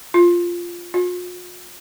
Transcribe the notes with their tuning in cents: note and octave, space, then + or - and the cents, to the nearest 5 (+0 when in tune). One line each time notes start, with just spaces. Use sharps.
F4 -5
F4 +45